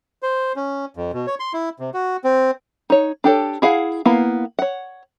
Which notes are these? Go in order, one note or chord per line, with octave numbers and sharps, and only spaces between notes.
C5
C#4
F2
B2
C#5
C6
E4
C3
F#4
C4
D#4 C#5
D4 G4 A4 C#5
E4 G#4 F5 F#5
A#3 B3 E4 F5
C#5 F#5